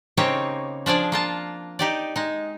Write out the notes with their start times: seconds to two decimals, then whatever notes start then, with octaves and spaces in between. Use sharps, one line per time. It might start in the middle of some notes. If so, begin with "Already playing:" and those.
0.17 C#3 A#3 C4 D#4 G4 C#5
0.86 F3 D4 G#4 D5
1.12 A#3 F4 A5
1.79 D#4 G4 D5
2.16 G#3 D#4